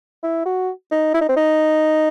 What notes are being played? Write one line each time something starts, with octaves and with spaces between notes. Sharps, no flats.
E4
F#4
D#4
E4
D#4
C4
D#4